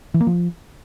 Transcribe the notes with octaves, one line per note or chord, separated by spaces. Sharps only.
E3
A#3
F3